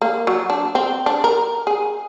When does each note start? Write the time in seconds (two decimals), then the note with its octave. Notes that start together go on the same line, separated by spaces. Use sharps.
0.02 A#3
0.27 F#3
0.50 D4
0.75 C4
1.06 D4
1.24 A#4
1.67 G#4